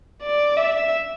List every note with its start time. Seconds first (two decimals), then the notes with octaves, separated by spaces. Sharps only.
0.23 D5
0.57 E5